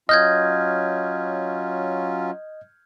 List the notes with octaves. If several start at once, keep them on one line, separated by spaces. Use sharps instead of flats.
F#3 C#4 F4 D#5 F6 G6 G#6